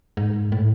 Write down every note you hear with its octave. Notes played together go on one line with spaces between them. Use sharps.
G#2
A2